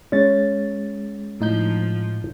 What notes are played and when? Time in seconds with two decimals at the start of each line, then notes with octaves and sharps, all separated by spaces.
0.12 G#3 C#4 A6
1.40 A2 F3 D#4 G6